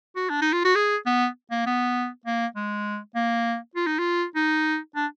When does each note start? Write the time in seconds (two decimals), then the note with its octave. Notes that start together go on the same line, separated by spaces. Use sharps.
0.16 F#4
0.30 D4
0.42 D#4
0.53 F4
0.65 F#4
0.76 G#4
1.06 B3
1.51 A#3
1.66 B3
2.26 A#3
2.56 G#3
3.15 A#3
3.76 F4
3.87 D#4
3.99 F4
4.36 D#4
4.95 D4